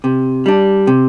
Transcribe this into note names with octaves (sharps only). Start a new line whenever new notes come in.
C3
G3 D4
C3